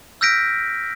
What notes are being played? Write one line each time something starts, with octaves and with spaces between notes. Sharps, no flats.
E6 F6 G6 A#6 B6 D7